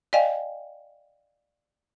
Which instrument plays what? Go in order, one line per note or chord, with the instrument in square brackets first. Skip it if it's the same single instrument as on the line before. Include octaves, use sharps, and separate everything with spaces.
[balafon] D5 D#5 F5 G5 G#5